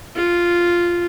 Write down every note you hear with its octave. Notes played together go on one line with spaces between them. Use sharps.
F4